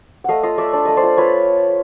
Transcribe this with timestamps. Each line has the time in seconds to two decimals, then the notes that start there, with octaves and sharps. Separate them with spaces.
0.24 A3 D#5 F5 F#5
0.43 F4 D#5 F5
0.58 A3 D5 E5
0.73 D4 D5
0.85 A3 D#5
0.97 C5 D5
1.03 F4
1.17 F4 B4 C#5